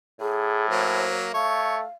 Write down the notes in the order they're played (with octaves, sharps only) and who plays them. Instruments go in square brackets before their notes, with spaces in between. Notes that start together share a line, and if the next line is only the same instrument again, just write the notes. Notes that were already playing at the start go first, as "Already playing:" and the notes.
[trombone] A2 [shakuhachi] G#4
[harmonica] F#3 A#3 [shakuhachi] C5
[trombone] A3 [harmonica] C#5 [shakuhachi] F5